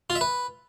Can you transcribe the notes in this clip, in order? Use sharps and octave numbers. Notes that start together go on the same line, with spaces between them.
F4
E5
B4